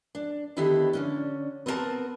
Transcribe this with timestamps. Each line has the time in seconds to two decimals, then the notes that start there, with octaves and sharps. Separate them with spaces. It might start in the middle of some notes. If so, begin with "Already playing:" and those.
0.15 D4
0.57 D3 D#3 B3 E4 G4 A4
0.93 D3 C#4 D4
1.66 B3 C4 E4 F4 A#4 A5